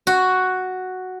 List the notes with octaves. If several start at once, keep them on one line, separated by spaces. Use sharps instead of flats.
F#4